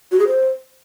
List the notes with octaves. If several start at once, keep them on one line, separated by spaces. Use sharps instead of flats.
F#4
G#4
C5